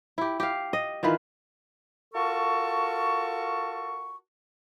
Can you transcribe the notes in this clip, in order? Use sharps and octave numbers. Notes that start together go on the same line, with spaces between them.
E4 G4
G4 F5
D#5
D#3 E3 F4 B4
F4 F#4 A4 A#4 A5 C#6